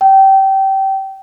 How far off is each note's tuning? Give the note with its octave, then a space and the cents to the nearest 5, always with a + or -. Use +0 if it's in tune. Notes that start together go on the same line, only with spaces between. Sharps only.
G5 -20